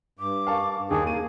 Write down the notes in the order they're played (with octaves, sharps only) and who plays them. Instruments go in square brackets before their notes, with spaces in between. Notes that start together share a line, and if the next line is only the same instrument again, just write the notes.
[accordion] G2 [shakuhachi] D6
[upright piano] F5 A5 C#6
[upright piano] D#2 [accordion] G#4 [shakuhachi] A5
[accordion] A#3 [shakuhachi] G#4 [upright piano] D#7